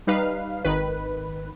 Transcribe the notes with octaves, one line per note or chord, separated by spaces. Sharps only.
G3 D#4 B4 F5
G#1 D#3 B4